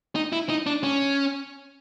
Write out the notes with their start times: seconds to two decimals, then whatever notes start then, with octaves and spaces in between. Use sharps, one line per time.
0.15 D#4
0.32 E4
0.49 D#4
0.66 D4
0.83 C#4